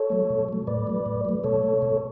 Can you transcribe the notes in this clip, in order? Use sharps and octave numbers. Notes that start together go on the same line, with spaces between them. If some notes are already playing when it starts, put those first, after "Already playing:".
Already playing: A4 C#5
F#3 A3
B2
F#3 A3
A2 B4 D5
F#3 A3
A2
F#3 A3
B2 A4 C#5
A3
B2